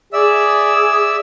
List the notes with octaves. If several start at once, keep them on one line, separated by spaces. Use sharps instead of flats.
G#4 D5 E5 E6